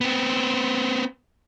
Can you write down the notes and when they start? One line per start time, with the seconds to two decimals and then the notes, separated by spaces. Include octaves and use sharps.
0.01 B3 C4